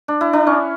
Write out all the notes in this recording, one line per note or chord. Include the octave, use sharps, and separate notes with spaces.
D4
E4
D4
C#4